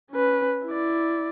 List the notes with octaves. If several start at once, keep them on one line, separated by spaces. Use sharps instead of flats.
C#4 B4
E4 D5